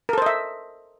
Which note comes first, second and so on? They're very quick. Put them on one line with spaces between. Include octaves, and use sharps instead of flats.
A#4 A4 C5 D#5 E5